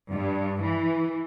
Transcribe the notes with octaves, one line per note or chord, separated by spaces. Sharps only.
G2
E3